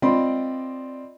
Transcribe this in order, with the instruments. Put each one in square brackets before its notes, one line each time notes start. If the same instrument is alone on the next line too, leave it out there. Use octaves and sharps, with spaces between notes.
[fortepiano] C4 F4 D5 D#5 B5 C6